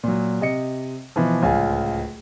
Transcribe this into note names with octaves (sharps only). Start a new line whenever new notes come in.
A#2 F#3
C3 D#5 C#7
B2 E3 F3
D1 C#2 F4 C#5 G#5